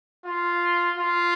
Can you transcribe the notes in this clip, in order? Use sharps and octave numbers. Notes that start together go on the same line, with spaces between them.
F4
F4